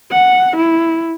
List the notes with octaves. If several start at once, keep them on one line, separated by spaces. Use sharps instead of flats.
F#5
E4